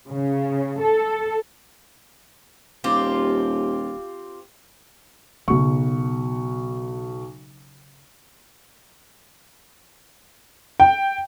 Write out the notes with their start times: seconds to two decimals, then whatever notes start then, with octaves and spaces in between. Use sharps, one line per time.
0.10 C#3
0.82 A4
2.84 D#1 C4 F4 G4
5.48 B1 C#3 F#3 C#6
10.80 G5